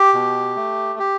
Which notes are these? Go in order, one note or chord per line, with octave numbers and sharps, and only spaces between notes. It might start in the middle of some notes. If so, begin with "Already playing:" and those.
Already playing: G4
B2
A3
G4